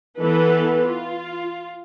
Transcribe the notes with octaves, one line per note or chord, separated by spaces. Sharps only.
E3 B3 A4 B4
F4